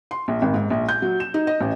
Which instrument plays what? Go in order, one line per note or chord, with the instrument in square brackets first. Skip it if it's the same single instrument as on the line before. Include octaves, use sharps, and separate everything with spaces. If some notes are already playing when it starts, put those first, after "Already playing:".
[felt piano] C6
A#1
G#1
G#2
A#1
G6
F#3
E7
D#4
D#5
A1